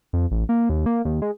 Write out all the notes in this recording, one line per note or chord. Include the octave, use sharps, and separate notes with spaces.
F2
A1
A#3
D#2
A#3
D#2
G#3